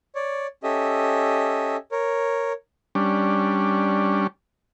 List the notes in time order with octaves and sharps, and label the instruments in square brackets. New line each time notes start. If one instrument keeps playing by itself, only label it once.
[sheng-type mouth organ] C#5 D5
C#4 G4 A4 D#5 E5
A#4 C#5
[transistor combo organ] G3 C#4 D4